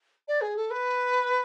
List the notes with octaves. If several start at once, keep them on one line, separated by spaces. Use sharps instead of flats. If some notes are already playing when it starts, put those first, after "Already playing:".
D5
G#4
A4
B4